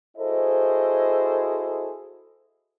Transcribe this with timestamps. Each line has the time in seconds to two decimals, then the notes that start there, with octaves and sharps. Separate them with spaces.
0.17 E4 F#4 G#4 A4 C5 D#5